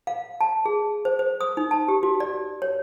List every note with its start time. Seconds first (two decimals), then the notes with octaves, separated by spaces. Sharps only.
0.07 F5
0.41 A5
0.66 G#4
1.05 C5
1.19 C5
1.41 D#6
1.57 D#4
1.71 A5
1.88 G4
2.03 F#4
2.20 D5
2.62 C#5